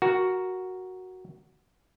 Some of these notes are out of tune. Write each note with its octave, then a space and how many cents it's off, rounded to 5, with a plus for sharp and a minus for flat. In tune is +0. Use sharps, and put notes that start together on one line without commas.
F#4 +0 A#4 +0